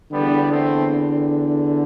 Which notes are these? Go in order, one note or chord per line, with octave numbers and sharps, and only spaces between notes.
E2 D3 G3 B3
A3 C4